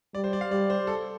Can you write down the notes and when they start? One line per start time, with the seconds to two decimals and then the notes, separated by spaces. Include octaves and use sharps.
0.14 G3 D5
0.24 C5
0.33 D5
0.41 F5
0.51 G3 D5
0.70 C5
0.87 A4